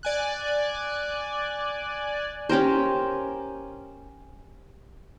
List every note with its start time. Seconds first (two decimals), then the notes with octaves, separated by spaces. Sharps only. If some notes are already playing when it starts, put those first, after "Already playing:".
0.03 D5 G#5 F#6
2.49 C#4 G4 A#4 C5